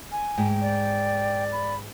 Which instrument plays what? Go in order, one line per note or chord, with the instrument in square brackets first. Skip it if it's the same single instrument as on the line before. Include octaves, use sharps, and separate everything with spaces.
[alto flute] G#5
[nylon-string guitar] G#2 [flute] G5
[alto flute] D5
[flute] B5